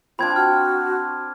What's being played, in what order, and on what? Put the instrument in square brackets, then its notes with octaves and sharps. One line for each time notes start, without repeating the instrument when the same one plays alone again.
[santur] C4 D4 [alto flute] F4 [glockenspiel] B5 G#6
[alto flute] F#4 [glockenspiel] F6